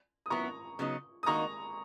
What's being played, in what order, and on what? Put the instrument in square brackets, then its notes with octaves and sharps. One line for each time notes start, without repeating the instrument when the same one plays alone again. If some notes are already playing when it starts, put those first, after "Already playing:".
[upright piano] D#6
[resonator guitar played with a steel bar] F#3 B3 E4 [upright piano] A#5 C#6
[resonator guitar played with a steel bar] C#3 F#3 B3 D#4
[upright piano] D#6
[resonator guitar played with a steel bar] D#3 A#3 D#4 F#4 [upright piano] A#5 C#6